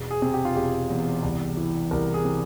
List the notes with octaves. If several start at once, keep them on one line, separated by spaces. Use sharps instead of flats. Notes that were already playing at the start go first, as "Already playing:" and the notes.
Already playing: E1
G#4
C3
G4
F4
E1 G4
E2
C2
E3
C2 A#4
G#4
C3